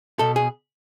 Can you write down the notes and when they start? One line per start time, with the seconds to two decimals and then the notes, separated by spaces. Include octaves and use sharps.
0.19 B2 A4
0.36 G#4